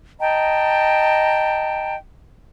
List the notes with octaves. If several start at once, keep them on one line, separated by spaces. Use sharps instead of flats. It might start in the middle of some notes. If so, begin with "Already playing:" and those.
D#5 G5 A5 A#5